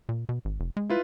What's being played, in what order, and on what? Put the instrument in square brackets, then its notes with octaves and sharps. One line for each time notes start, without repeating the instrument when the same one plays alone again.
[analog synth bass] A#2
B2
G#1
F1
G#3
[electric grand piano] E4 F4 B4